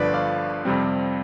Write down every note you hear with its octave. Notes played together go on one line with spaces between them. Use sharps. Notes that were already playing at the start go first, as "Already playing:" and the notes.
Already playing: G1 G2 D3 F3 B4 D5
D5 F5
F2 C3 G3 C4